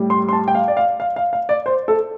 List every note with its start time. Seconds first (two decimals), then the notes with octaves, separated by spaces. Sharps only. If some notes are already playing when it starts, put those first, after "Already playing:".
Already playing: A2 G3
0.10 C6
0.29 C6
0.33 A5
0.48 G5
0.55 F5
0.68 D5
0.77 F5
1.00 F5
1.16 F5
1.33 F5
1.49 D5
1.66 C5
1.88 A4